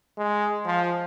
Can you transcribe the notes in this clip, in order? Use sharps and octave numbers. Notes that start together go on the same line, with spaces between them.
G#3
F3